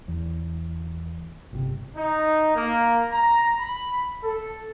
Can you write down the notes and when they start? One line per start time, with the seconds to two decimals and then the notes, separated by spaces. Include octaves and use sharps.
0.08 E2
1.52 G1 C3
1.96 D#4
2.55 A#3
3.11 A#5
3.58 B5
4.23 A4